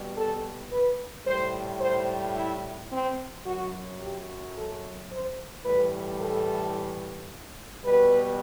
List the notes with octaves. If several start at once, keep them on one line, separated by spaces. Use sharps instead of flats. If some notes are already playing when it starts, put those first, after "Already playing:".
Already playing: B2 G3
A4
B4
A2 G3 C5
C5
E4
C4
F#2 F#3 F#4
G4
A4
C5
A2 E3 G3 B4
A4
B2 G3 B4